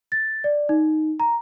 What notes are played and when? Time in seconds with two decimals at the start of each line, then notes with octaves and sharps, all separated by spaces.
0.12 A6
0.44 D5
0.69 D#4
1.20 A#5